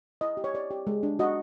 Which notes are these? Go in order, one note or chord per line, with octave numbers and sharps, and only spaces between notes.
E4 D#5
G4
C#5
G4 D5
G4
G#3
D4
F#4 D#5